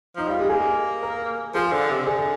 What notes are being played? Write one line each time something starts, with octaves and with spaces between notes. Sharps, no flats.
F3 D#4
G3 F4
G#3 G4
A#3 G#4
A#4
F3 G#4
D3
C3
D3 G#4